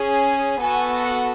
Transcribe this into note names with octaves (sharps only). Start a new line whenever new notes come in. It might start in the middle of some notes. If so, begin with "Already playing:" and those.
Already playing: C#4 G#4
B3 F#4 A4 G#5
F#5